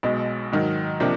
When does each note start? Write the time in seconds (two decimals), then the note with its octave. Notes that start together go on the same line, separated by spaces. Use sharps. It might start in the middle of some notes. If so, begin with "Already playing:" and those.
0.03 B1 B2 G#3
0.52 G#2 D#3 F#3
1.00 C3 F3 A#3 D4